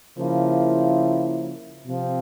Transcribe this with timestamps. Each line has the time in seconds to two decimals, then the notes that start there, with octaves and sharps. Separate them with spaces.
0.17 C#3 F3 A#3 E4
1.85 C3 F3 C4